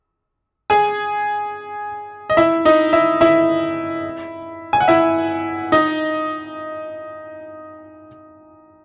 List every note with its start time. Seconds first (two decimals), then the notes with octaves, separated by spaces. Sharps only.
0.70 G#4 G#5
2.30 D#5
2.37 E4 E5
2.65 D#4 D#5
2.93 E4 E5
3.21 E4 E5
4.73 G#5
4.80 F#5
4.88 E4 E5
5.72 D#4 D#5